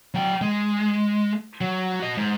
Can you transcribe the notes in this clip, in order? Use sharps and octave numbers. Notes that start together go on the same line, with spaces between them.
F#3 G5
G#3
F#3
F#4 D#5
G#2